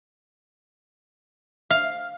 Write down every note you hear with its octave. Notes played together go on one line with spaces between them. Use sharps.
F5